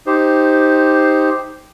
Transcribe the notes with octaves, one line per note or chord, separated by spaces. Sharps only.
D#4 G4 C5